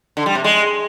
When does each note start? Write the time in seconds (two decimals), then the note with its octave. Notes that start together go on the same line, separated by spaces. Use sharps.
0.17 D3
0.26 G3
0.35 C3
0.44 G#3